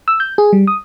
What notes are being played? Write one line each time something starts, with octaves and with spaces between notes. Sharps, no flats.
E6
G6
G#4
G3
D#6